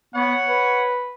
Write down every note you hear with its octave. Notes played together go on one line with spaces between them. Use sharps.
B3 C#5 F#5
B4